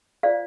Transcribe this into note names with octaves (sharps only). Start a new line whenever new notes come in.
F4 C5 D5 F5